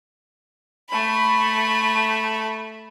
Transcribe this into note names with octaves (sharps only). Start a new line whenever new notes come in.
A3 B5